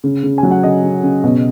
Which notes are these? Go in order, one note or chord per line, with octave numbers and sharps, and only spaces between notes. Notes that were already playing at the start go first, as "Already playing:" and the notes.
C#3
C#3
G#5
F#3
F#5
C#3 D#5
C#3
C#3
B2